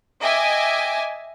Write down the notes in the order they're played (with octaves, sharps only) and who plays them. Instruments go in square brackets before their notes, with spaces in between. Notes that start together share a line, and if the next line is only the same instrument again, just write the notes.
[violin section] D#5 E5 G5 G#5 D6